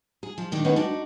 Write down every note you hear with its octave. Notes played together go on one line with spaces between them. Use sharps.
G#4
F3 F4
A#2 D#3 D4 D#4
D#3 G#3 A#3 B3 C#4 D#4
D4 D#4 F#4